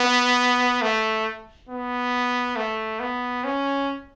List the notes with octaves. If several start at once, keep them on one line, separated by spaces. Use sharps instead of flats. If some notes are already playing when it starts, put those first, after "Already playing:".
Already playing: B3
A3
B3
A3
B3
C#4